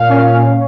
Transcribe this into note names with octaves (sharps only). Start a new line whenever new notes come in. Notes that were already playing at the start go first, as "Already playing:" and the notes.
Already playing: A#2 F5
C#4